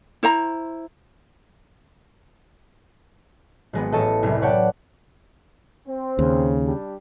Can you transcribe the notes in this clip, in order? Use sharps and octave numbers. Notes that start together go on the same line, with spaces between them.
E4 C5 A#5
G#1 G#3 B3
A1 A4 D#5 A5 C#6 E6
F#1 C2 A2 G#5
B4 C#5 D5 F#5 G5 A5
C4
D#2 C#3
G3 D4 G4